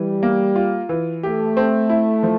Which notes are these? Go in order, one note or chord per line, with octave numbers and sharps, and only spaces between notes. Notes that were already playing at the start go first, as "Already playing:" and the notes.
Already playing: E3 G3
A#3
F4
E3
A3 G4
C4
E4
F3